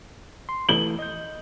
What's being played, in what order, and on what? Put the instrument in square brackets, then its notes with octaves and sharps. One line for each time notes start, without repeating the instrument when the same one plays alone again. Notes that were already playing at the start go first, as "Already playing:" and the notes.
[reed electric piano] C6
[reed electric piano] E3 A3 [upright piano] F#7 G7
[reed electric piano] D#5 G6